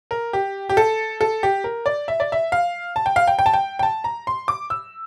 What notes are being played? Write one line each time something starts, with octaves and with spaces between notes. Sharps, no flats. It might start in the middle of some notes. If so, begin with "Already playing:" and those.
A#4
G4
G4
A4
A4
G4
A#4
D5
E5
D5
E5
F5
A5
G5
F5
G5
G5
A5
G5
G5
A5
A#5
C6
D6
E6